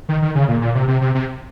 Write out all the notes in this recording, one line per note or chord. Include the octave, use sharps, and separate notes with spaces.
D#3
D#3
C#3
A#2
A#2
C3
C3
C3
C3